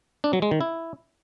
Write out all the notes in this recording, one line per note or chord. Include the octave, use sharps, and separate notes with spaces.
D4
F#3
G#3
D#3
E4